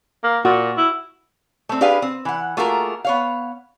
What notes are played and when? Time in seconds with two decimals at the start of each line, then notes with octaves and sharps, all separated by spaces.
0.24 A#3
0.45 A#2 F#4
0.78 E4
1.69 A3 C4
1.81 D4 G4 G#4 B4 F5
2.02 C4
2.25 E3 F#5
2.57 A3 A#3 F4 F#4 G#4 A#4
3.05 B3 C#5 F5